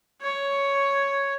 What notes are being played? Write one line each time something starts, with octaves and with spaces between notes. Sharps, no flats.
C#5